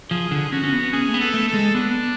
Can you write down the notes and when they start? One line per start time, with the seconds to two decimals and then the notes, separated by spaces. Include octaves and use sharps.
0.10 F3 G#4
0.31 D3
0.52 C#4 F#4
0.64 C#4
0.72 B3
0.92 C#4 G#4
1.09 A3
1.14 B3
1.20 A4
1.34 A3
1.48 A4
1.54 G#3
1.75 B3 D4